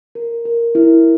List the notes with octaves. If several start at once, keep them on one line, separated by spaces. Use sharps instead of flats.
A#4
A#4
E4